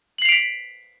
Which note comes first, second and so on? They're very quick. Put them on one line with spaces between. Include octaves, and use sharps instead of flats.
F#7 C7 F7 D7 B6